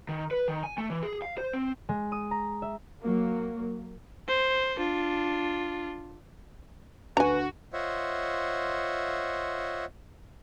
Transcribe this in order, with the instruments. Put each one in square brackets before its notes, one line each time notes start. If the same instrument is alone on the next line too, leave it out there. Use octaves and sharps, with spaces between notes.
[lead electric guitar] D#3
B4
D#3
G#5
A3
E3
G#4
F5
C5
C4
[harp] G#3
D#6
A#5
E5
[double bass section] F#3 A#3
[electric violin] C5
D4 F4
[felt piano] D2 [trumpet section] F#4 [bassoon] B4 [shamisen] G#5 A#5
[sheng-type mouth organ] F4 C5 C#5 D#5 E5 F#5